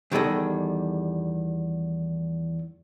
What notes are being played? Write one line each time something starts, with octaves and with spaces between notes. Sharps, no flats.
E2 D#3 G3 G#4 A4 D#5